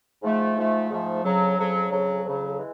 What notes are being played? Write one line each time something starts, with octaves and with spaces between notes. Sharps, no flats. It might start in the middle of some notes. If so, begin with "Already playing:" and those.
G#2 F3 A3
G#2 F3 A3
G#2 F3 A3
F2 C#3 F#3
F2 C#3 F#3
F2 C#3 F#3
F2 C#3 F#3
E3 G#3